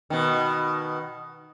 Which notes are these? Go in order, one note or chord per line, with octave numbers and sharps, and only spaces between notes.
B2 D#3